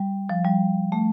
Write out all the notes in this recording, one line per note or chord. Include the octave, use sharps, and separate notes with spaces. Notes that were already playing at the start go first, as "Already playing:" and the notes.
Already playing: G3
F3
G3
A3